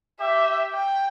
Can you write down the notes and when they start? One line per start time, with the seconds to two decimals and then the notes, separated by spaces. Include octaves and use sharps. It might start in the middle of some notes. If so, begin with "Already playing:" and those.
0.20 G4 E5
0.74 G5